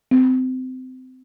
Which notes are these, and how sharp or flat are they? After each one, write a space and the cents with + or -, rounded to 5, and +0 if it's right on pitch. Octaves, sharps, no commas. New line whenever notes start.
C4 -25